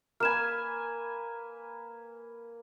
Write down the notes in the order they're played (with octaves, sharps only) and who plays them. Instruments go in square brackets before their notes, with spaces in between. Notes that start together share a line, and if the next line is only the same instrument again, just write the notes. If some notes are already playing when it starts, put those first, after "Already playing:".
[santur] A#3 B4 G#5 [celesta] F6 E7